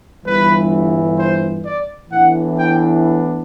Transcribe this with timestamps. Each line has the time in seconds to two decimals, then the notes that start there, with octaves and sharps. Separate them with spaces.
0.24 G1 G2 E3 B4
1.17 C5
1.63 D5
2.09 A2 E3 B3 D4 F#5
2.56 G5